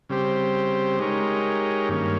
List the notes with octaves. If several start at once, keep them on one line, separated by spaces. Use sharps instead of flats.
C#3 G3 C4 G4 C5
G#3 D#4 G4 A#4 C#5
G2 D#3 A#3 C#4